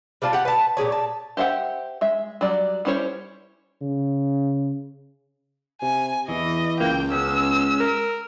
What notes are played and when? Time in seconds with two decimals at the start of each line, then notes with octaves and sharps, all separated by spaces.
0.22 G3 D4 F4 A5
0.33 G4 F#5
0.45 B4 A5
0.77 A#2 G4 G#4 C#5
0.92 A5
1.37 G4 C5 E5 F#5 G5
2.01 G#3 E5
2.41 F#3 G3 D5
2.85 G3 C#4 E4 C5 C#5
3.81 C#3
5.82 C3 G#5
6.28 E2 E3 D#5
6.80 C#2 A#3 G5
7.12 G#3 B3 C#4 E6
7.80 A#4